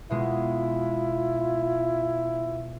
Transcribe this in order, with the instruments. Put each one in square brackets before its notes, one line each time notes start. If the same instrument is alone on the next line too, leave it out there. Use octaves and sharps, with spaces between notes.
[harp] B2 G#3 [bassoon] E4 [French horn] F4